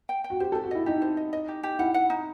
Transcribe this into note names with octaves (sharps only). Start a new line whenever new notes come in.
G5
G5
F#4
G4 C5
A4 C5
F#4
E4 D#5
D#4 G4
C5
D#5
D#5
G4
G4
E4 F#5
F#5
D#4